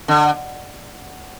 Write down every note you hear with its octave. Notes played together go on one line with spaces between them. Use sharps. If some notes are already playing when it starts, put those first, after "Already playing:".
D3